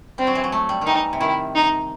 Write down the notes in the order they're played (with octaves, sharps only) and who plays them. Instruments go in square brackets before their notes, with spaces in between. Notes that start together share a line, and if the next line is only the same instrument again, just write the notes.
[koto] G3 [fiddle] C4
[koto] F#3
E3
F#3
A3
G3
D#3
[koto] E3 [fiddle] D#4
[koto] C3
[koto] D#3 [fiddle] E4
[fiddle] D#4